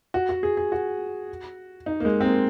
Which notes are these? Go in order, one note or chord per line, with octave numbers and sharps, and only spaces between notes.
F#4
F#4
G#4
G#4
F#4
D#4
A#3
G#3
C4
A#3